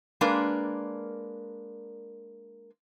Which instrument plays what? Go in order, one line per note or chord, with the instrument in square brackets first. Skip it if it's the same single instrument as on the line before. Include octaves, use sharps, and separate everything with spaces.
[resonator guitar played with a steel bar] G#3 A#3 D4 A#4 B4